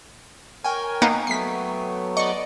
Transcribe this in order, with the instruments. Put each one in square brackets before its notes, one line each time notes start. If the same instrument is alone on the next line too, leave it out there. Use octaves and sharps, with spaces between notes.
[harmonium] A#4 C#5 [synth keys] G5 G#5
[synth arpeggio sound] A#3 B3 D#4
[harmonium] F#3 A3 B3 [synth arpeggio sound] B6 C7
[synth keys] D5 D#5 [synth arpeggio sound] C#6